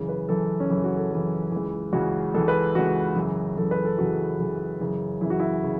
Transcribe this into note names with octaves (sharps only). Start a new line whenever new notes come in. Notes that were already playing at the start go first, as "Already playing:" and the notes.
Already playing: F#2 C#3 E3
B4
F#2 C#3 E3 A4
C#4
F#2 C#3 E3 E4
F#4
A4
F#2 C#3 E3
C#2 C#3 E3
C#2 C#3 E3 F#4
C#2 C#3 E3 A4
B4
C#2 C#3 E3 F#4
F#2 C#3 E3
F#2 C#3 E3 A4
B4
A4
F#2 C#3 E3 F#4
F#2 C#3 E3
F#2 C#3 E3
F#2 C#3 E3 E4
F#4
E4
C#3